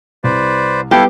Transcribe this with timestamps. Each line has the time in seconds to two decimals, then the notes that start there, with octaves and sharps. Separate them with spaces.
0.24 C2 B4 C5 D5
0.91 G3 B3 E4 G4 A4 F5